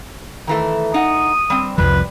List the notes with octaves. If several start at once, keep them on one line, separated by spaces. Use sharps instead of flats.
D#3 E3 A3
D#4 F#5 D#6
G3 C4
C2 F2 F3 G3 B4